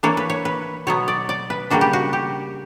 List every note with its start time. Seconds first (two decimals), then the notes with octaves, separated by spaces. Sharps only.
0.03 E3 A#3 D4 C#5
0.17 B4
0.30 C#5
0.45 B4
0.87 B2 F#3 B3 C#5
1.08 D5
1.29 D5
1.50 B4
1.70 C#3 G3 A#3 D4 F#4
1.81 G4
1.93 F#4
2.13 G4